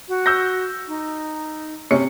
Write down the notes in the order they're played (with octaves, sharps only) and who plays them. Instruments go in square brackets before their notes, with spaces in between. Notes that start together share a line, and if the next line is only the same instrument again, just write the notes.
[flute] F#4
[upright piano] E6 G6 A#6
[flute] D#4
[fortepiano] C3 C#4 [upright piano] C#7